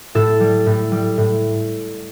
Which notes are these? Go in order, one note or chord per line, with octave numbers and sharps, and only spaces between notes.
A2 A4
G3
A2
G3
A2